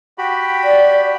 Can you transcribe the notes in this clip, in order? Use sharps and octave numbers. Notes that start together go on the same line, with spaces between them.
F#4 G4 B5
D5